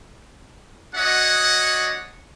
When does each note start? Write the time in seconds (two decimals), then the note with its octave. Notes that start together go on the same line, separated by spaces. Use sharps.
0.95 D4 F#4 C#5 D#5 F#5